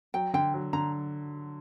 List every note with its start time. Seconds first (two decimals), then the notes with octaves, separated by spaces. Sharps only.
0.14 F#3 G5
0.34 D3 G5
0.54 F#3
0.73 D3 A#5